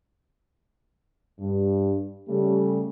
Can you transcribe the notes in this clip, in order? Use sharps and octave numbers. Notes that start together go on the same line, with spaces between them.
G2
C#3 G3 A3